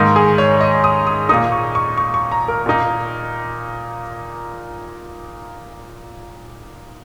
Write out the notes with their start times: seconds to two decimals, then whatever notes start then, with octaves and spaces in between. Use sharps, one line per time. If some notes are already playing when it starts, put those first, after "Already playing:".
Already playing: G#2 D#3 A#3 D#4
0.16 G#4
0.38 C#5
0.60 D#5
0.84 D#6
1.07 D#6
1.29 A#2 A#3 D#4 D#6
1.52 C#6
1.75 C#6
1.98 C#6
2.14 C#6
2.32 A#5
2.48 A#4
2.66 A#2 A#3 D#4